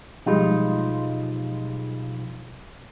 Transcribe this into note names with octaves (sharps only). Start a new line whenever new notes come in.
B1 F3 G3 G#3 D#4 F4